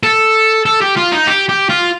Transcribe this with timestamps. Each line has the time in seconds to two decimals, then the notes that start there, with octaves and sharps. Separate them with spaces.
0.03 A4
0.65 A4
0.82 G4
0.97 F4
1.12 D#4
1.27 G4
1.49 G4
1.70 F4